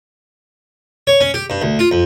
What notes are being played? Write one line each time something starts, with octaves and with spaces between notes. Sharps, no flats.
C#5
C#4
G4
G2
D2
F4
F2